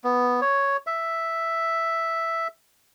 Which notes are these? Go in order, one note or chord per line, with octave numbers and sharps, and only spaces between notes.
B3
C#5
E5